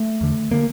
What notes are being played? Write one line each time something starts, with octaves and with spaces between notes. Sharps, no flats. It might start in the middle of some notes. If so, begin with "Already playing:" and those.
Already playing: A3
E2 D3
D3 A#3